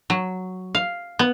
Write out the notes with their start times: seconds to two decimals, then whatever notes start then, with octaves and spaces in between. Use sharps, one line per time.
0.10 F#3
0.75 F5
1.19 B3